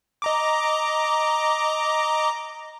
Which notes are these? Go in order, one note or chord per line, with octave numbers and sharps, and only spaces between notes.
D#5 A#5 D6